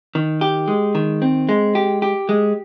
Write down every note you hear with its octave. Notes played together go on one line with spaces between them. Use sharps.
D#3
G4
G#3
D#3
C4
G#3
G4
G4
G#3